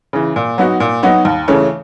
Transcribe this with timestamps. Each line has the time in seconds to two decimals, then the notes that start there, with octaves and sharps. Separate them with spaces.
0.13 C#3 E3
0.36 A#2
0.58 F#3 B3 D#4 F#4
0.80 A#2
1.03 F#3 B3 D#4 F#4
1.25 D#2
1.48 C#3 E3 A3 C#4